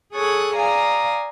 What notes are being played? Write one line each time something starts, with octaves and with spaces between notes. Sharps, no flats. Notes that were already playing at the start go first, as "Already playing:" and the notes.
G#4 A4 C#5 C#6 D#6 F#6
D5 F5 G#5 A#5 D#6